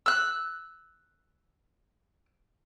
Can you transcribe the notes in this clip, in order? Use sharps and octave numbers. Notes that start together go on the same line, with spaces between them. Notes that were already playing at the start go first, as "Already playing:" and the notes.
E6 F#6